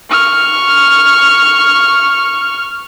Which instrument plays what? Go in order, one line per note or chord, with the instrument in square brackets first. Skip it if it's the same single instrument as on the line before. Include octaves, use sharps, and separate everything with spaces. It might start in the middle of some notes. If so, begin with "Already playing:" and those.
[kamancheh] C#6 F6